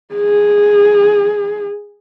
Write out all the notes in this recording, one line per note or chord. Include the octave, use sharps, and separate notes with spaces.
G#4